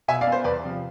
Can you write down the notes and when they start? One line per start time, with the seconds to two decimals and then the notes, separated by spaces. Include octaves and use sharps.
0.08 B2 E5 G#5
0.21 D5 F5
0.27 B3
0.32 C5
0.44 E2 B4 D5
0.63 C3 F3